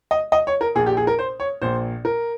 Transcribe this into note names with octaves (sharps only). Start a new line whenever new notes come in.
D#5
D#5
C#5
A#4
A#1 A#2 G#4
G4
G#4
A#4
C5
C#5
A#1 A#2 C5
A#4